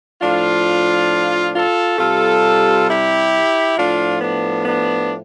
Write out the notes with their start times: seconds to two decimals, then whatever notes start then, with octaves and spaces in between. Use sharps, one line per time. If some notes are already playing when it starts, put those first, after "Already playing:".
0.20 A2 F3 D4 F4
1.54 F4 A4
1.98 C3 G3 F4 A4
2.87 E4 G4
3.77 A2 F3 D4 F4
4.21 B3 D4
4.65 B3 D4